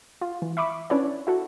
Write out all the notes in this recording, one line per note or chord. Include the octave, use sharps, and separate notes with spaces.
F4
E3
E5 B5 C#6 D6
C#4 D4 E4 B4 C#5 D5
E4 F#4 A4